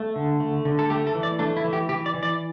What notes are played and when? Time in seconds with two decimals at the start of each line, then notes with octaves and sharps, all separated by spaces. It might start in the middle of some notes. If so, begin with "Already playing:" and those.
Already playing: A3
0.16 D3
0.40 A3
0.65 D3
0.79 A4
0.90 A3 G4
1.07 A4
1.15 E3
1.23 D5
1.39 A3 D4
1.57 E4
1.64 E3
1.73 G4
1.89 E3 G4
2.06 D5
2.14 E3
2.23 D5